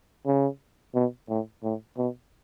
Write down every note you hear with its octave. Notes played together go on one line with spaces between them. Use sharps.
C#3
B2
A2
A2
B2